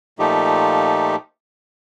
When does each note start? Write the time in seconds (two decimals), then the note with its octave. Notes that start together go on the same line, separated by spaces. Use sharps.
0.19 A#2 F3 A3 D#4 G4